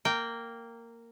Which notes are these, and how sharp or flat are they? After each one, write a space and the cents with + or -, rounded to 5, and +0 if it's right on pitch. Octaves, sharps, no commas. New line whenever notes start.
A#3 -10 G5 -5